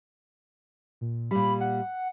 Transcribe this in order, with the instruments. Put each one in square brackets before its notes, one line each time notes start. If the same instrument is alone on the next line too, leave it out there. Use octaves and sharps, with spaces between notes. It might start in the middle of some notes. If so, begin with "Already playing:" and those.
[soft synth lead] A#2
[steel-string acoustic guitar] A#2 G3 [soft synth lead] B5
[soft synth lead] F#5